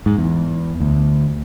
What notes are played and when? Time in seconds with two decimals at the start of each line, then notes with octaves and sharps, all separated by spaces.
0.06 G#2
0.18 E2
0.80 D2